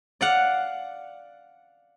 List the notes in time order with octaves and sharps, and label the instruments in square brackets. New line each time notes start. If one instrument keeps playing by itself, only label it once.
[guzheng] D5 F5 F#5